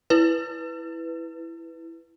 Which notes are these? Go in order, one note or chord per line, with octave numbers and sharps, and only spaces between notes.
E4 B4